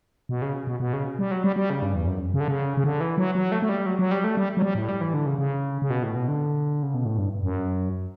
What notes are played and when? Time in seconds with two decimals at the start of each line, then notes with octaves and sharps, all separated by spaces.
0.29 B2
0.42 C#3
0.67 B2
0.80 B2
0.93 C#3
1.19 G3
1.31 F#3
1.44 G3
1.56 G3
1.70 C#3
1.82 G2
1.95 E2
2.07 F#2
2.34 C#3
2.40 D3
2.48 C#3
2.77 C#3
2.84 D3
3.01 E3
3.18 F#3
3.35 F#3
3.52 A3
3.62 A3
3.69 G3
3.86 F#3
3.99 F#3
4.11 G3
4.24 A3
4.37 G3
4.57 F#3
4.62 G3
4.75 A2
4.89 G3
5.01 E3
5.14 D3
5.26 C#3
5.39 C#3
5.82 C#3
5.90 B2
6.03 A2
6.16 B2
6.28 D3
6.83 C#3
6.94 B2
7.05 A2
7.18 G2
7.43 F#2